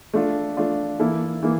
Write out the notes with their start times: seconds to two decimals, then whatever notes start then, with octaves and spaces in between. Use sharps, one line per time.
0.14 A3 D4 F4
0.57 A3 D4 F4
0.99 E3 A#3 E4 A4
1.43 E3 A#3